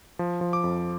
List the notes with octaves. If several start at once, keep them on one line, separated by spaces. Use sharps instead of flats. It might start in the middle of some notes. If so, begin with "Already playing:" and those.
F3
F3
D6
F2